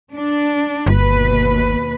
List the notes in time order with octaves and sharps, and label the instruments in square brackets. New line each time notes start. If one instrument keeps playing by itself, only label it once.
[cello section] D4
[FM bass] G1 [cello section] D#2 B2 B4